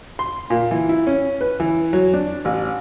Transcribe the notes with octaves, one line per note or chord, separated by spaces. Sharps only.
C6
A#2
E3
E4
C#4
B4
E3
F#3
D4
A1